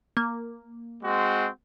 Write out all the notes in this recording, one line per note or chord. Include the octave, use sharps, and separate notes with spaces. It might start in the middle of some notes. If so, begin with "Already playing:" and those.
A#3
G#3 C4 F#4